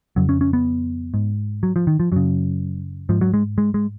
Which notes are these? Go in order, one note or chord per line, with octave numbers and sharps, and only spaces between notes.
F2 C#3 F#3
C#4
C#4
B3
G#2
F#3
F3
D#3
F3
F#2 C#3 F#3
G#2 F3
F#3
G#3
G#3
G#3